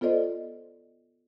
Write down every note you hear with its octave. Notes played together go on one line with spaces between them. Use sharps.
B3 F4 A4 C5 D5 D#5